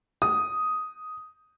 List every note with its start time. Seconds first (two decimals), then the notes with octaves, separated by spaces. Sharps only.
0.22 D#6